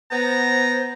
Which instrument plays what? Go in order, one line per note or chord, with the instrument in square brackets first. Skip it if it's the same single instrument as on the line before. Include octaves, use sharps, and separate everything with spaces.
[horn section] B3 [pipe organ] C5 [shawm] A#5